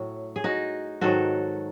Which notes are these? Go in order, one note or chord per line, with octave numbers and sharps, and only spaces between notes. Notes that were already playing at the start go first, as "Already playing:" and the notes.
Already playing: A2 F#3
G#4
D#4 F#4
G#2 D#3 F#3 F#4 A4